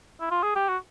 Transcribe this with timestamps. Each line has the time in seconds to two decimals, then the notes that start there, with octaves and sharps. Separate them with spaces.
0.21 E4
0.31 F4
0.43 G#4
0.56 G4
0.69 F#4